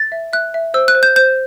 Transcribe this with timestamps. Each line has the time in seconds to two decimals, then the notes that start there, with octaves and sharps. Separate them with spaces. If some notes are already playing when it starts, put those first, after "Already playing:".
Already playing: A6
0.12 E5
0.33 E5 F#6
0.54 E5
0.74 C5 E6
0.88 F#6
0.95 C5
1.03 G6
1.16 C5 G6